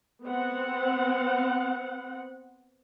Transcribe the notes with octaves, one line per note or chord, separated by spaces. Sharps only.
B3 C4 F#5